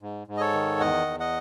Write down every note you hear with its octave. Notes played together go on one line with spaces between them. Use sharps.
G#2
G#2
D#5
A4 C#5
D#3
E2 D#5 F#5
E2
D#5 F#5